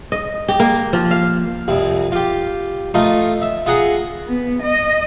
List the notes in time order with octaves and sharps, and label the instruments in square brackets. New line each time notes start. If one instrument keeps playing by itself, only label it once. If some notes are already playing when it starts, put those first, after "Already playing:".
[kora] D#5
G4
A#3
F3
F5
[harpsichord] C2 F2 C3
F4 G4
A3 D#4 F4
E5
F4 G#4 F#5 A#5
[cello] B3
D#5